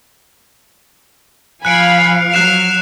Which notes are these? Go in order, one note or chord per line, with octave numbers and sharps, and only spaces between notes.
F3 F5 G#5 B5 F#6 C#7 D7
F#3 F6 F#6 C7 E7